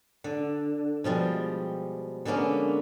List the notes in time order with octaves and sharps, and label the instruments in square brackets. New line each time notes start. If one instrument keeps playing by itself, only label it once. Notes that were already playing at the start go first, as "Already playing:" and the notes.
[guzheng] D3
B2 F3 G3 G#3
D3 G#3 A#3 B3 C#4